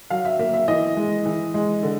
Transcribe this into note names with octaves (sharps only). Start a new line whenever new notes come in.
F#3 F5
E5
A#3 E5
E5
E3 D#5
G#3
E3
G#3
D3